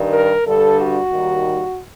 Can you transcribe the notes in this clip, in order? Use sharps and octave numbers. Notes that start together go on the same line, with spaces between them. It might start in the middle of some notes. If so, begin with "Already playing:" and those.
Already playing: G2 D#3 G3
A#4
G2 D3 G3 A4
F#4
D#2 D#3 G3